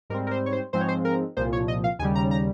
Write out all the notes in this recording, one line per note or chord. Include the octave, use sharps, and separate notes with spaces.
G#2 G3 C4 A#4
A#4
C5
C#5
C5
G#2 F3 G#3 C4 C5
C#5
C5
A#4
C2 A#2 F3 C5
C#5
D#5
F5
D#2 C#3 G3 G#5
A#5
A#5